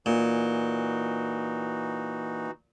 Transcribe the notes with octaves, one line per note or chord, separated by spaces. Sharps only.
A#2 E3 D#4 F#4